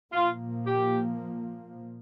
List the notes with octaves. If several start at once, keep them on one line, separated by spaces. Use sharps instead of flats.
A#2 F3 A#3 F4
G4